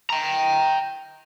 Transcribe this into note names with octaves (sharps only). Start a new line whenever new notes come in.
G5 A#5